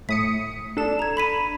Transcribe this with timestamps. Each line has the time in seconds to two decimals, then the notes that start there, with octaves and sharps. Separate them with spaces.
0.09 A2 D#6 B6 C#7
0.77 D4 A4 E7
0.99 A#5 G#6
1.17 B5 B6 D#7